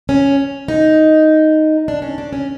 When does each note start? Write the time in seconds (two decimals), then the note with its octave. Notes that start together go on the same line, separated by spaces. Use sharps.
0.09 C#4
0.68 D#4
1.88 D4
2.02 C#4
2.18 D4
2.33 C#4